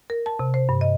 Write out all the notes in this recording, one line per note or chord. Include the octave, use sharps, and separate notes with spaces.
A#4
A5
C3
C5
G2
D#5